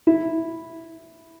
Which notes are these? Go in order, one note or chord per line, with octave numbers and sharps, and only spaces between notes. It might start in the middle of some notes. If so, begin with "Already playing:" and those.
E4